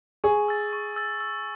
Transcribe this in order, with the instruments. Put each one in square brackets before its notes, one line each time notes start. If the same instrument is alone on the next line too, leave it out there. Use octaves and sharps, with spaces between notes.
[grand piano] G#4 [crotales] C#6
[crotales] E6 A6
C#6
E6 A6
E6